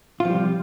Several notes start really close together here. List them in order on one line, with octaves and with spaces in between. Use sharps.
F4 F3 G3 C3